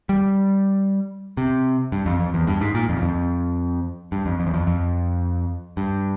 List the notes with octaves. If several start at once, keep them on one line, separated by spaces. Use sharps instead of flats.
G3
C3
G2
F2
F2
E2
G2
G#2
A#2
F2
E2
F2
G2
F2
F2
E2
F2
F2
G2